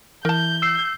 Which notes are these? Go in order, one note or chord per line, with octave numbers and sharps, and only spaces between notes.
E3 A#4 A5 G6
E6 C7